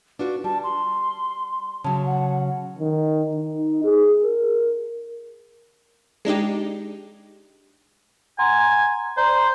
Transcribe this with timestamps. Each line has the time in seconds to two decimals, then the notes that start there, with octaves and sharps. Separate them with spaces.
0.19 D4 F4 F#4 B4
0.44 G3 A5
0.64 C6
1.84 C#3 F#3 A5
2.06 F#5
2.79 D#3
3.37 D#4
3.84 G#4
4.24 A#4
6.25 G#3 D4 D#4 G4
8.39 F#5 G#5 A#5 C6
9.17 C5 D5 A#5